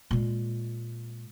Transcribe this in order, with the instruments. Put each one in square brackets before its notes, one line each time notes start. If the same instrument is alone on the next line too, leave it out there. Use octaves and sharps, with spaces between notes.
[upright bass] A#2 G#3